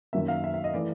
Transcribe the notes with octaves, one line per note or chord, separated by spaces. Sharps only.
F#2 D#3 F#3 A#3 E5
F5
E5
E5
D#5
E3 A3 D5